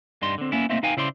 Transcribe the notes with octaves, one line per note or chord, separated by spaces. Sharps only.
G2 G3 D#4 C6
D3 C4
A#3 B3 C#4 E4
A3 A#3 C4 D#4 C5 E5
D#4 B4 F5 G5 G#5
C#3 E4 C5 D5 C6